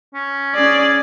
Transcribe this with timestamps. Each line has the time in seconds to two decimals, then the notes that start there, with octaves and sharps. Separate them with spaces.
0.14 C#4
0.56 C#4 G#4 D5